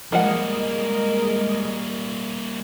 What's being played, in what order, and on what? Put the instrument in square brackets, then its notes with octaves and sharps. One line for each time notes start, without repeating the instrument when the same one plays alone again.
[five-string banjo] F3 F#5 [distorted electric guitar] G3 A#3 [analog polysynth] G#3 D#5 [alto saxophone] A#4